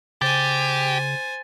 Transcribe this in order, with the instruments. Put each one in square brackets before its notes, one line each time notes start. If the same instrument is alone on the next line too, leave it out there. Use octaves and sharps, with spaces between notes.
[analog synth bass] C#3 [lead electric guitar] G4 [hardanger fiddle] C5 G#5 [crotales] A6